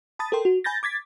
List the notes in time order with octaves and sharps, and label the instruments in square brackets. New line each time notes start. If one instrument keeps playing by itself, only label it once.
[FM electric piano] A5 B5 D#6 A6
A4 A#4 G5 C6
F#4
G#5 B5 G6 A6 A#6
D6 G#6 A6 B6